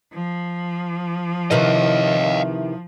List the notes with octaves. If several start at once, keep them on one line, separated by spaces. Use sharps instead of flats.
F3
C3 D#3 E3 D#5 F5